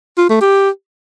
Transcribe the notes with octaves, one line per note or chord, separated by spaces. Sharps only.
F4
A3
G4